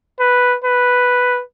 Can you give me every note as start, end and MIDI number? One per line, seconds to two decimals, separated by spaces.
0.20 0.56 71
0.65 1.42 71